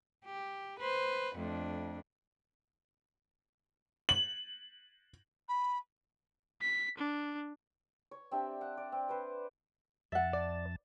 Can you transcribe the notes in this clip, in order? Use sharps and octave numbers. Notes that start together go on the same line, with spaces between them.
G4
B4 C5
F2 A3 D4
F#7
B5
B6
D4
C#5
C4 D4 G4 E5
F#5
D5
C4
B4 C5
F2 E5 F#5 A5
D5